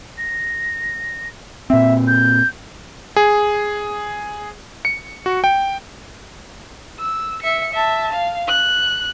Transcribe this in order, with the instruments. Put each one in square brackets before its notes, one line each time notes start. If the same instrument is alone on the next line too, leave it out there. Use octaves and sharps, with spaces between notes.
[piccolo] A#6
[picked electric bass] A#2 C4 [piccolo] E5
[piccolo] G6
[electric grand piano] G#4
C#7
F#4
G5
[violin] E6
E5 C#7
E5 A5
F5
F#6